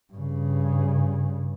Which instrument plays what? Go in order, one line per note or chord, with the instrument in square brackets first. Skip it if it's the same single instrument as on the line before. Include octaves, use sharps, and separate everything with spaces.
[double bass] G2 C#3